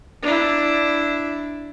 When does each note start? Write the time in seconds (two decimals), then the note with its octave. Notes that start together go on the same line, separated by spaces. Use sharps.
0.22 D4 E4